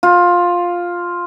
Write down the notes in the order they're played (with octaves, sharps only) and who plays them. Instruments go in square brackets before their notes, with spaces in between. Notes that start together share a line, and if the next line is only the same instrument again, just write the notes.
[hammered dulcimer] F4